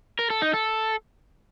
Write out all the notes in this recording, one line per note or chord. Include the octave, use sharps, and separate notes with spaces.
A#4
A4
D#4
A4